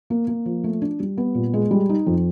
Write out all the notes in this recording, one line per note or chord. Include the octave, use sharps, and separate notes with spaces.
A#3
A#3
F3
A3
D4
G3
B3
A#2
G#3
G3
D#4
F2